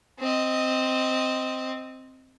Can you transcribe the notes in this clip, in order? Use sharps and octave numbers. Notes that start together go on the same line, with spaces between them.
C4 D#5